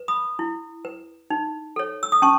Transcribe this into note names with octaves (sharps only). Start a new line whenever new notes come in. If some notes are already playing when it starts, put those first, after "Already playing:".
Already playing: B4
B5 D#6
E4
B4
D#4
A4 C#5
E6
D#6
C#4 A5 C#6